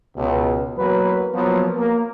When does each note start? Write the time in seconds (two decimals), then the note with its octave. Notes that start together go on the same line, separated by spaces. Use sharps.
0.17 C#2 B2
0.77 E2 F#3 A#3 B4
1.34 F3 F#3 A#3 B3
1.78 A#3